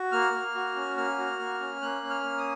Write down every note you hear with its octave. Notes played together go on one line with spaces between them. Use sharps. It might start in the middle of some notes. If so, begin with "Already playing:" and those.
Already playing: F#4
A#3 F6
A#3
F#4
C#4
A#3 F6
F#4
A#3
C#4
A#3 F#6
C#4
F6
A#3
D#6